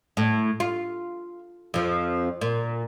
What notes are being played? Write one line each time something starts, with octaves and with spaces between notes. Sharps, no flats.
A2
F4
F2 F3
A#2